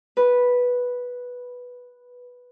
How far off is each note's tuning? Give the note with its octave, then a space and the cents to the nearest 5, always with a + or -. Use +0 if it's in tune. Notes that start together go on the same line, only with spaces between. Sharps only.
B4 -5